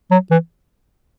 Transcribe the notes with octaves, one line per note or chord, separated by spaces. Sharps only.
F#3
E3